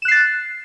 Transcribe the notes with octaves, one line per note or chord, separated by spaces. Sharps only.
F#6 A6 C7 E7